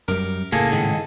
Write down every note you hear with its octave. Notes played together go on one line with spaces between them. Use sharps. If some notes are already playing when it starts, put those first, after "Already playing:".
F#2 G3 A#4 D6
A2 C#3 A#3 G#4 A4
G#2 D#3